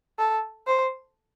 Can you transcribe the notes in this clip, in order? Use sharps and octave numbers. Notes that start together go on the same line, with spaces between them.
A4
C5